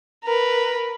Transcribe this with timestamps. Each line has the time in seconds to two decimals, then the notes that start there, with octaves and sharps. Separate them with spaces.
0.24 A#4 B4